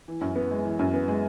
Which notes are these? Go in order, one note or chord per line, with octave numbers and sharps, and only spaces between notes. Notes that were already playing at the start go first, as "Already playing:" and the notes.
E3
F#2
B3
G#3
E3
F#2
B3
G#3